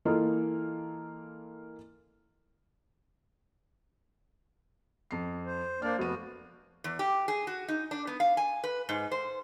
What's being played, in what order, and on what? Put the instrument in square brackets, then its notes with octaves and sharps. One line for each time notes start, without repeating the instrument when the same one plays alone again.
[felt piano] E3 A#3 F4 A4 D#5
F2 C7
[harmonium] C5
[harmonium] A#3 D4 D5 [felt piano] C5 F6
[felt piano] F1 D#7 [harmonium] B3 F#4
[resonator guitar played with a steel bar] E2
G4
G#4
F#4
D#4
D4
B3
F5
G#5
B4
G#2
C5